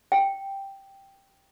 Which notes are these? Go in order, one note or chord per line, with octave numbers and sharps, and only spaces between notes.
G5